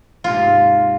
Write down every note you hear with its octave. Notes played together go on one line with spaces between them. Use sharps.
D#2 G#2 C3 F4